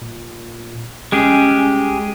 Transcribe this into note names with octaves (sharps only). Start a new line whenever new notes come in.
A#2
C2 G#3 C#4 G4 G#4